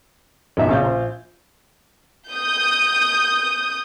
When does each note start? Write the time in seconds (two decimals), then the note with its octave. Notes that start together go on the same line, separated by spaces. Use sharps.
0.57 A#1 F#2 B2 D#3 F#4 E5
0.69 A#1 A#2 C#3 C#4 F5 G6
0.84 C5
2.29 D#6 G6